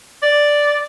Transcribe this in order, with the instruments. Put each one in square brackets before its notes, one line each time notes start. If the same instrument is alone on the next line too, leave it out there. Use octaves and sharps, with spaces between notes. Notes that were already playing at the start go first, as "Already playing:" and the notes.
[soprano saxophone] D5